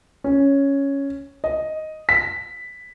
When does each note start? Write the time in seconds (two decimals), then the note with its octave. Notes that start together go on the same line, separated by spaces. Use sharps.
0.24 C#4
1.44 D#5
2.09 B6